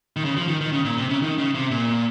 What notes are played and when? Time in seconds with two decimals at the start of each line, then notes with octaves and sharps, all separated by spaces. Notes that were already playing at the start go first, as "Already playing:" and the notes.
0.16 D#3
0.25 C#3
0.37 F3
0.48 D#3
0.61 D#3
0.72 C#3
0.85 A#2
0.97 C3
1.10 C#3
1.22 D#3
1.38 C#3
1.55 C3
1.71 A#2